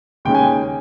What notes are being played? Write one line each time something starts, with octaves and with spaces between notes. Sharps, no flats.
D#2 C#3 G#3 C#4 G5
G#5
G5